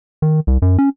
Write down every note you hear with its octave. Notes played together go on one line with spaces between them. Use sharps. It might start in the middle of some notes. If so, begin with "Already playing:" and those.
D#3
C2
F#2
C#4